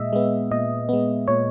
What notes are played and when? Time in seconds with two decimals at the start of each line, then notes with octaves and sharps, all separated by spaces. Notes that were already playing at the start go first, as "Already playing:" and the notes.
Already playing: A#2 G#3 D#5 E5
0.13 G#3 B3
0.51 A#2 D#5
0.89 G#3 B3
1.28 A#2 C#5